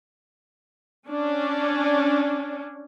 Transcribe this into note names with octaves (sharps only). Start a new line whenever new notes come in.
C#4 D4